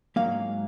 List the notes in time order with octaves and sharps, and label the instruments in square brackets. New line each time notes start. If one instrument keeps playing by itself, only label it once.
[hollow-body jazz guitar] G#2 F#3 A#3 F5